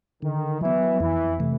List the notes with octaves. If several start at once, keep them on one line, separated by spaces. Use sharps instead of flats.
D3 D#3
E3 F#3 B3
F2 E3
C3 E3 A3